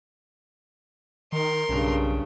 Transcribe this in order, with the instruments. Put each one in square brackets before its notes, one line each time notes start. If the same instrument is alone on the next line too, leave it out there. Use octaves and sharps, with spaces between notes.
[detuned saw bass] D#3 [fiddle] A#4 C6
[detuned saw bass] B1 [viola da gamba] G2 C#3